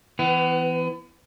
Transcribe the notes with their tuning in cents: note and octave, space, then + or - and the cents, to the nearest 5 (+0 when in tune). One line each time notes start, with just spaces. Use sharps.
E3 +5 B3 +35